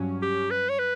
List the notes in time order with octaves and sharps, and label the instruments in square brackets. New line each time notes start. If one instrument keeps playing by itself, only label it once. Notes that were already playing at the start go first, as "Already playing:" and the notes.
Already playing: [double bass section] G2 F#3 C#4
[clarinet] G4
B4
C#5
B4